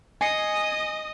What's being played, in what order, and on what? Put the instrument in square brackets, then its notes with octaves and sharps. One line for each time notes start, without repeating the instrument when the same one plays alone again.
[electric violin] D#5 D#6 [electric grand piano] G#5 C7 C#7